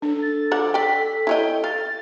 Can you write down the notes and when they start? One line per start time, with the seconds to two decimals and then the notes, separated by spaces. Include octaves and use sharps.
0.02 D4 A4
0.22 A6
0.51 F3 C5 F#5 D6
0.74 D5 G5 B6
1.27 E4 C#5 D#5 G5
1.64 F5 A6